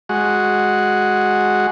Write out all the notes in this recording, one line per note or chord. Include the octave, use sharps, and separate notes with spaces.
G#3 F#4